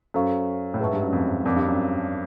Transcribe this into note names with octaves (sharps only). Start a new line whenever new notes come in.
F#2 A4 C5 F5 A#5 C#6
A2
G#2 G#4 B4 E5 A5 C#6
G2
F#2
F2
F2 A#4 D5 F#5 A5 D6
G2
F#2